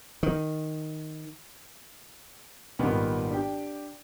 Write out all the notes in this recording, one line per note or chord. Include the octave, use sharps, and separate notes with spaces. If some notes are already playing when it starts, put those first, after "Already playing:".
D#3
G#1 A#2 D#3 G3 B3
D4 G4 G5